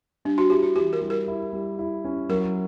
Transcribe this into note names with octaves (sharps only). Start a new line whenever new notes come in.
G3 D4
F#4
E4 G4
F#4
E3 G4
A#4
G3
A#4
E4
G3
E4
C#4
F#3 A#4